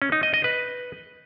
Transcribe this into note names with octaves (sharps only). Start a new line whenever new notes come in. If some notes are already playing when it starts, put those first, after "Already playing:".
C#4
D#4
D#5
D#5
B4